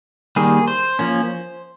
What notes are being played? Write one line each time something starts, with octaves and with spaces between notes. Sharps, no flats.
D#3 G3 A#3 G#4
C5
F3 A#3 C#4